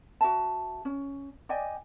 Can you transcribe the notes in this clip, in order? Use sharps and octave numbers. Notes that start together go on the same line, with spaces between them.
F#4 E5 A5
C#4
D5 D#5 G5 G#5